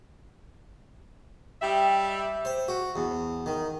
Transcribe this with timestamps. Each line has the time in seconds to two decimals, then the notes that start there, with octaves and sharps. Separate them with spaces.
1.62 G3 G4 D#5 E5
2.45 C5
2.68 F#4
2.96 E2
3.46 D#3